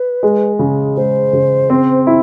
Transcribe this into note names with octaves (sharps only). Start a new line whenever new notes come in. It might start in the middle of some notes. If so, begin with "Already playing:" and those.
Already playing: B4
G#3
C#3
G#3 C5
C#3
C4
E4